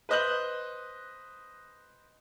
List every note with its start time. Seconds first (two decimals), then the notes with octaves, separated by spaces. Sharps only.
0.09 B4 C5 D#5 F#6 G6 F#7